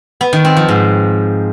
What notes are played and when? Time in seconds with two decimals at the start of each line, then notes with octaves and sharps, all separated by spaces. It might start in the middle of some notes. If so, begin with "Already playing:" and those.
0.21 B3
0.33 D#3
0.45 C4
0.56 F3
0.68 G#2